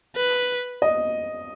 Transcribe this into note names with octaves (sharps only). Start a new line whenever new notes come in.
B4
D#5